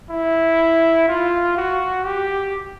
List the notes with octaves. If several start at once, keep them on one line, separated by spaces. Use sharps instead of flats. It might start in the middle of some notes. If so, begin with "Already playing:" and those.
E4
F4
F#4
G4